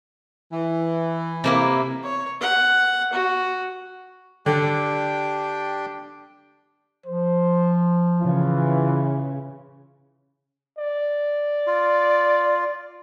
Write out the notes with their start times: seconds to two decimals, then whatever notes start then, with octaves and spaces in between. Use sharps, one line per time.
0.53 E3
1.44 C3 A#3 E4
2.03 C#5
2.41 F#5
3.13 F#4
4.46 D3 D4 G4 G5
7.06 F3 C5
8.21 C#3 E3 F4
10.78 D5
11.67 F4